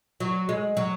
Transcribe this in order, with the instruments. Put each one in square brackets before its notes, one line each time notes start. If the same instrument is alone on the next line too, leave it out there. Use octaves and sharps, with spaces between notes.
[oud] F#3
G#3
F#3